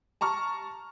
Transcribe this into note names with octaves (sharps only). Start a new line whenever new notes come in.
A5 A#5 C#6 F6